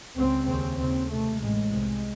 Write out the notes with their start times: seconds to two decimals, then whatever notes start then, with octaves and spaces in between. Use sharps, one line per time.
0.17 C#2 C#3 C4
0.48 D#2 C#3 C4
0.78 D#2 C#3 C4
1.10 C#2 C3 A3
1.40 A1 A2 G#3
1.71 C2 C3